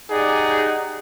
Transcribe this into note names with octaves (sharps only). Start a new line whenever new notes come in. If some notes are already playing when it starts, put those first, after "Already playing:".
D#4 G4 G#4 D5 F#5